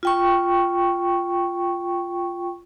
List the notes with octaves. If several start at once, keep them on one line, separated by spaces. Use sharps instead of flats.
F4 G5 C#6